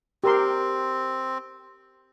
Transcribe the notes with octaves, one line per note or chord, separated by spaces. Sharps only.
C4 G4 A#4 C6